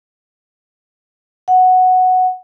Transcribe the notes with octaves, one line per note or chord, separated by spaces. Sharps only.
F#5